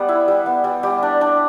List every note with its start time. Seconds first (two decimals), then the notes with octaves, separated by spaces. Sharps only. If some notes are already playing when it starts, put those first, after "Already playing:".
Already playing: G3 B3 B4
0.08 E4
0.28 G3
0.46 B3
0.64 G3
0.83 G3 G4
1.03 D4
1.21 D4